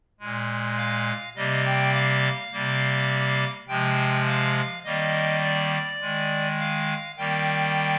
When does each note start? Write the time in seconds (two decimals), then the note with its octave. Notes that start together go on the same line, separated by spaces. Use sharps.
0.20 A#2 G#3
0.77 F5
1.36 C3 G3 A#3 D#5
1.65 G5
1.94 F5
2.52 C3 G3 A#3
3.68 C3 F3 G#3 G5
4.27 F5
4.85 D#3 G3 A#3 D#5
5.43 D5
6.01 D#3 G#3
6.59 F5
7.17 D#3 G3 A#3 G5